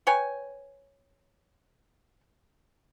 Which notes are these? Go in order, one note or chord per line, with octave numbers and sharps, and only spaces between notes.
B4 C#5 G5 G#5